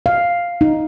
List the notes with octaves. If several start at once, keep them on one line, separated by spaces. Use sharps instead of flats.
F5
D#4